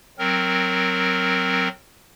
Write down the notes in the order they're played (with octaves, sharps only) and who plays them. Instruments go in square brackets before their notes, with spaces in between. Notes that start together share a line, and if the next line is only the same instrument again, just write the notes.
[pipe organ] F#3 C4 A#4